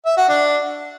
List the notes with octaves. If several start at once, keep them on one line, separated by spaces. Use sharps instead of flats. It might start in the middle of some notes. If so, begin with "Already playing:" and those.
E5
F#4
D4